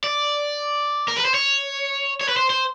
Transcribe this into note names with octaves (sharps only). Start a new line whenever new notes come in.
D5
A#4
B4
C5
C#5
C#5
B4
C5
C5